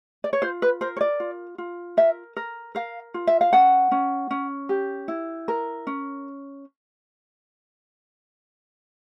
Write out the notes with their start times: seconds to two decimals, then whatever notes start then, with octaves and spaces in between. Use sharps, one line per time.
0.24 D5
0.33 C#5
0.42 F4 C5
0.62 B4
0.81 A#4 C5
0.97 C#5
1.01 D5
1.20 F4
1.58 F4
1.97 A#4 E5
2.36 A#4
2.75 A#4 F5
3.14 F4
3.27 E5
3.41 F5
3.53 C#4 F#5
3.92 C#4
4.31 C#4
4.69 G4
5.08 E4
5.48 A#4
5.87 C#4